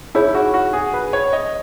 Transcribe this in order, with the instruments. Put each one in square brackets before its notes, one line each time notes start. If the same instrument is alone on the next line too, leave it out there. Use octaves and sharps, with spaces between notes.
[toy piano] D#4 G#4 C#5 [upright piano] E4
[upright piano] F#4
F#4
G#4
B4
C#5
D#5